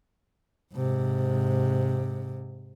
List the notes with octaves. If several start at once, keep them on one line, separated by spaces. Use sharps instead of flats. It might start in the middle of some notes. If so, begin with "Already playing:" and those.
G#2 C3